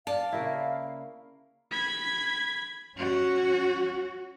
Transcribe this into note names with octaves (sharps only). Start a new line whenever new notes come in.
D5 F5 A5
C#3 A#3 E4
B5 G#6
C#4 F#4